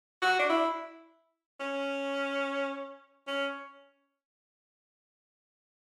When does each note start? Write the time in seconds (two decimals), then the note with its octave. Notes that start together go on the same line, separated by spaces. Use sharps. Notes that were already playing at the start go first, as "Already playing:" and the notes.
0.22 F#4
0.39 D4
0.49 E4
1.60 C#4
3.27 C#4